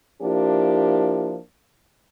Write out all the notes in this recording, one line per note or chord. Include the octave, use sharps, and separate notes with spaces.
F3 A#3 D4 E4 G4